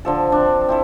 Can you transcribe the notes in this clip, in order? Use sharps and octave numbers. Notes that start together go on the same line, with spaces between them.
D3 F3 A4
C4 D4
C4 E4 A4